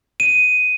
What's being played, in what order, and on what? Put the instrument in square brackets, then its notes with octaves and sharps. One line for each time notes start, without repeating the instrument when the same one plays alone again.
[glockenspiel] D#7